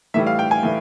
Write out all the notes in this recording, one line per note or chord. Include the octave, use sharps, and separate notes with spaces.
A2 E3 G3 E5
F5
G5
G#5
A2 E3